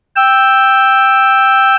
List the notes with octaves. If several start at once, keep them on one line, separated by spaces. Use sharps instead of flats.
G5 E6